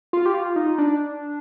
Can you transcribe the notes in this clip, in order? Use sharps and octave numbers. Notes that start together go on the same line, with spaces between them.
F4
G4
F4
D#4
D4